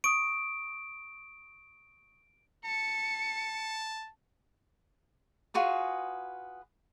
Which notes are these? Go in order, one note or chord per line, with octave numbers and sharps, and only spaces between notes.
C#6 D#6 D7
A5 C#7
F4 F#4 G#4 B4